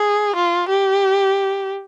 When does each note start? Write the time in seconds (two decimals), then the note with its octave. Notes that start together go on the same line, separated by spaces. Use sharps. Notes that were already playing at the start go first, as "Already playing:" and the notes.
Already playing: G#4
0.36 F4
0.69 G4